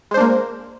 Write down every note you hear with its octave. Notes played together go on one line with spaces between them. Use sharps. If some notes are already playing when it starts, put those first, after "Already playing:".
G#3 A#3 D4 C5